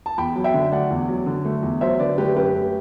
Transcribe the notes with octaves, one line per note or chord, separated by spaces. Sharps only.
A5
E2 G5 B5
F#3
E5 G5
D3
A3 D5 F#5
E2
F#3
D3
A3
E2
F#3 C5 E5
D3 B4 D5
A3 G4 B4
F#2 G4 B4
A3